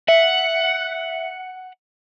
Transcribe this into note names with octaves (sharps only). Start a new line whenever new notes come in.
E5 F#5